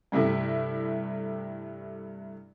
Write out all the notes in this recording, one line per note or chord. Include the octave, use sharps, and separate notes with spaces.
G2 C3 A3 E4